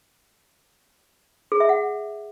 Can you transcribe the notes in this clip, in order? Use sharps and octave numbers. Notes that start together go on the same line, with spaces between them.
G#4
E5
F#5